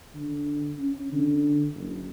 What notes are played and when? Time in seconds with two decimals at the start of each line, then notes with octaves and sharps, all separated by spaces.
0.15 D3
0.78 C#4
1.12 D3
1.74 F#1